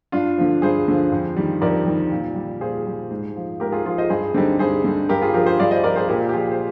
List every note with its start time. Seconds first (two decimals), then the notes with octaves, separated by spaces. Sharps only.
0.12 G2 D4 F4
0.38 D3 F3
0.62 G2 G#4 C5
0.88 D3 F3
1.12 F2
1.36 D#3 G3
1.61 F2 A#4 D5
1.86 D#3 G3
2.11 A#2
2.36 G3
2.61 A#2 G#4 C5
2.86 G3
3.11 G#2
3.36 F3
3.60 G#2 G4 A#4
3.72 F4 G#4
3.85 F3 F4 G#4
3.98 C5 D#5
4.10 G2 G#4 C5
4.34 D3 G3 C4 D#4
4.59 G2 G#4 C5
4.84 D3 G3
5.09 G2 G4 A#4
5.22 F4 G#4
5.34 F3 G4 A#4
5.46 G#4 C5
5.59 G2 D5 F5
5.71 C5 D#5
5.84 F3 A#4 D5
5.96 G#4 C5
6.08 A#2 G4 A#4
6.29 G4
6.33 F3 F4 G#4
6.51 C5